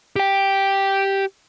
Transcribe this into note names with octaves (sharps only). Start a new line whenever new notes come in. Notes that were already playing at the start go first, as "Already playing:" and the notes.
G4 G5